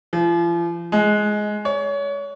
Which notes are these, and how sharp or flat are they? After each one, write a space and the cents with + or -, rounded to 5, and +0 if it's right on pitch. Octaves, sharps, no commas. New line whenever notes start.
F3 -40
G#3 +10
C#5 +30